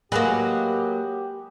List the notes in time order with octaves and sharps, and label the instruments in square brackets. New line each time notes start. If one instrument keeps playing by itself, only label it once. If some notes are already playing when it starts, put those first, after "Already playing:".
[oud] F#3 A#3 [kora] G#3 [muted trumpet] G4 [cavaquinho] B4 D#5 F#5